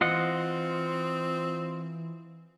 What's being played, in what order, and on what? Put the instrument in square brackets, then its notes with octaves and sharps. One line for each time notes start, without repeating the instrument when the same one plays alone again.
[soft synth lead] E3 [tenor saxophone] C4 [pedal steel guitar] F4 D#5 F#5